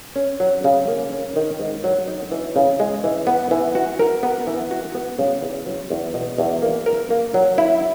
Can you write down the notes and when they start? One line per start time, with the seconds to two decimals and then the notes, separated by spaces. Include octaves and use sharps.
0.16 C#4
0.40 F#3
0.64 C#3
0.88 A#3
1.12 C#4
1.36 D#3
1.60 G#2
1.84 F#3
2.08 D#4
2.32 E3
2.56 C#3
2.80 G#3
3.04 E3
3.27 B3
3.51 E3
3.75 F#4
3.99 A#4
4.23 B3
4.47 E3
4.71 F#4
4.95 B3
5.19 C#3
5.42 E2
5.66 F#3
5.90 E2
6.14 B2
6.38 E2
6.62 A#3
6.86 A#4
7.10 A#3
7.34 F#3
7.58 E4